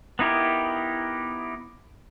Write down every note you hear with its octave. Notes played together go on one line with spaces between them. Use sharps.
B3 D#4 E4 G4 A#4